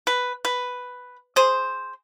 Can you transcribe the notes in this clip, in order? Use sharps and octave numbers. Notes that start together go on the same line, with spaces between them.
B4
B4
G#4 C5